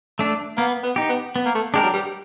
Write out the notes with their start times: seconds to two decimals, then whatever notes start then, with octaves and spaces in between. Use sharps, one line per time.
0.19 A3 D4
0.57 A#3 B3
0.83 B3
0.96 D#4 G4
1.09 B3
1.36 B3
1.45 A#3
1.55 A3
1.74 G#3 D4 G4 A#4
1.83 F#3
1.93 G3